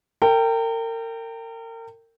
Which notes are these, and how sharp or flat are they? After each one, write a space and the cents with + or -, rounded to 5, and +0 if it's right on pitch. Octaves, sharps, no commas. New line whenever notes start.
A#4 -35 G5 +0